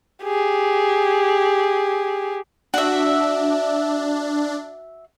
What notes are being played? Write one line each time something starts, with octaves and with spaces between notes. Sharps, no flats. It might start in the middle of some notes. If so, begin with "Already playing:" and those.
G4 G#4
D4 F#4 E5